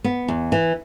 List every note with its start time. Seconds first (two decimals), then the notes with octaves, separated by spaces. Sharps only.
0.04 B3
0.28 E2
0.52 E3